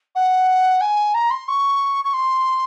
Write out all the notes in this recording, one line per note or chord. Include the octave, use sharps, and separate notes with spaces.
F#5
G#5
A#5
C6
C#6
C#6
C6